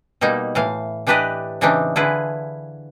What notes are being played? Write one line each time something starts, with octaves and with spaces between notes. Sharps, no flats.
B2 G3 A#3 D#4
A2 E3 F5
E3 D4 G4 B4 D5 D#5
C#3 E3 C4 D4 D#4
D3 E3 E4 F4 G#4 B4